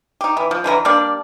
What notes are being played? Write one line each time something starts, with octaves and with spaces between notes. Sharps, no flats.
D#4 G4
E3
F3
D3 E3 A#4 A#5
G3 A#3 D4 D5